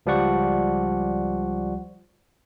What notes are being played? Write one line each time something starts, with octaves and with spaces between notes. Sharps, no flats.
C#2 F3 G3 D5 F#5 C#6